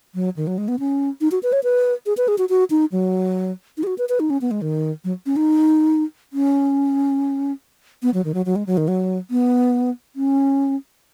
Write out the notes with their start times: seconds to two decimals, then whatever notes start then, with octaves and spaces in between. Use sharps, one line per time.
0.15 F#3
0.36 D#3
0.47 F#3
0.58 G#3
0.68 B3
0.79 C#4
1.21 D#4
1.32 F#4
1.43 B4
1.53 C#5
1.64 B4
2.06 G#4
2.17 B4
2.28 G#4
2.38 F#4
2.49 F#4
2.70 D#4
2.92 F#3
3.77 D#4
3.83 G#4
3.87 F#4
3.98 B4
4.09 B4
4.20 D#4
4.30 C#4
4.41 B3
4.51 G#3
4.62 D#3
5.04 F#3
5.26 C#4
5.36 D#4
6.33 C#4
8.03 B3
8.14 F#3
8.25 D#3
8.34 F#3
8.46 F#3
8.56 G#3
8.67 F#3
8.77 D#3
8.88 F#3
9.31 B3
10.16 C#4